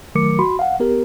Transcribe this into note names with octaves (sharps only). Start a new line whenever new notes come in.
D#3 F#3 A3 A#4 D6 C#7
F#4 B5 C6
F5 F#5
B3 G4 A#4